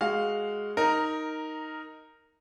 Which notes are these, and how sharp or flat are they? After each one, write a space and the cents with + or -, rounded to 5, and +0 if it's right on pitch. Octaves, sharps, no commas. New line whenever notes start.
G#3 +0 F#4 +0 F5 +0
D#4 +5 A#4 -5